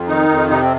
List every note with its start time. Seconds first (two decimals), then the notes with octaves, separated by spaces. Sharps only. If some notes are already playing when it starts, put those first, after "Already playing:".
Already playing: F2
0.08 D#3 D#4
0.29 F2
0.49 C3 D#4
0.61 C4